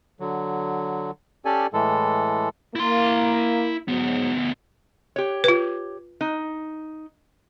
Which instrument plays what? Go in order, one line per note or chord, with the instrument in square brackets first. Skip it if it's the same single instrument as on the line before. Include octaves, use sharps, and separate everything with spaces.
[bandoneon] D3 F#3
C#4 G4 A4 D5 G#5
A2 E3 G#3 A4
[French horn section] A#3 [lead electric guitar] E4 C6
[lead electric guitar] D2 B3 [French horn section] G#2 F#3
[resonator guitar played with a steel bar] G4 C#5
[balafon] F4 B4
[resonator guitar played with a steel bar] D#4